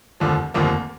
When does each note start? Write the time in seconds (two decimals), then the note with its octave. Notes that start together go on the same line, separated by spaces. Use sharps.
0.20 F1 D#2 D3 F3
0.54 F1 D#2 D3 F3 A#3